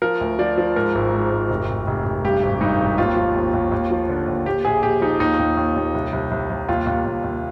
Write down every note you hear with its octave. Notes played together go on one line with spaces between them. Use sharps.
F3 A#4
D2
F3 D5
F3
G#2 A#4
G#1
G#2
G#1
F1
F1
F1
F1
G2 G4
G#1
G2 D#4
G#1
D#2 F4
F3
D#2
D#2
D#2
F3
D3
D#2
A#2 G4
A#1 G#4
A#1 G4
F3 D#4
D#2 D#4
D#2
D#2
D#2
C2
C2
C2
C2
D#2 F4
D#2
D#2
D#2